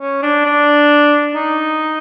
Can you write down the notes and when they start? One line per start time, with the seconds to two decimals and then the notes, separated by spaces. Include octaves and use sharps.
0.01 C#4
0.23 D4
0.46 D4
1.35 D#4